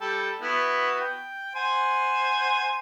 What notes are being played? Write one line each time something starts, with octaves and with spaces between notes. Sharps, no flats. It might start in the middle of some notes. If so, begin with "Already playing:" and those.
G3 A4 G5
B3 E4 F#4
G5
C5 F#5 G#5